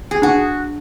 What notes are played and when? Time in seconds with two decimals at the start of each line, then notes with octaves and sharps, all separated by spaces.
0.11 G#4
0.22 D4 F#4